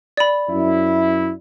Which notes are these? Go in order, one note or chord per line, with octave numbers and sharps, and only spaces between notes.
D5 B5
F#2 E4